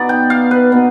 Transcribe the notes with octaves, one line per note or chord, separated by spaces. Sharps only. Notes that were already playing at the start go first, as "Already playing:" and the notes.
Already playing: B2 B3 D#4 D5
G5
F5
B4
B2 B3 D#4